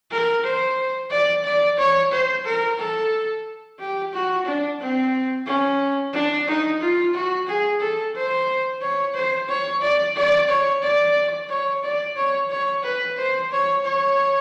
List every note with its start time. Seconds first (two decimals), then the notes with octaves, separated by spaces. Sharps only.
0.11 A#4
0.44 C5
1.10 D5
1.44 D5
1.77 C#5
2.12 C5
2.45 A#4
2.78 A4
3.79 G4
4.13 F#4
4.46 D4
4.80 C4
5.46 C#4
6.13 D4
6.48 D#4
6.81 F4
7.14 F#4
7.47 G#4
7.80 A4
8.15 C5
8.81 C#5
9.15 C5
9.48 C#5
9.82 D5
10.16 D5
10.49 C#5
10.83 D5
11.49 C#5
11.83 D5
12.16 C#5
12.50 C#5
12.83 B4
13.17 C5
13.51 C#5
13.85 C#5